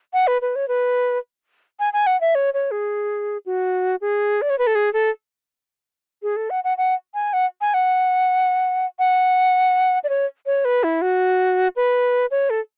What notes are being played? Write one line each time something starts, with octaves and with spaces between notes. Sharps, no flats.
F#5
B4
B4
C#5
B4
G#5
G#5
F#5
E5
C#5
C#5
G#4
F#4
G#4
D5
C#5
B4
A4
G#4
A4
G#4
A4
F#5
F#5
F#5
G#5
F#5
G#5
F#5
F#5
D5
C#5
C#5
B4
E4
F#4
B4
C#5
A4